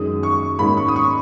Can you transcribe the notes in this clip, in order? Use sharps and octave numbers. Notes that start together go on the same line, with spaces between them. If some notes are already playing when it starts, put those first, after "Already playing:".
Already playing: F#2 D#3 G#3 D#6
C#6
G#2 D#3 A#3 C#4 B5
C#6
D#6
C#6